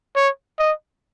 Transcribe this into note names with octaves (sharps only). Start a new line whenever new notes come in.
C#5
D#5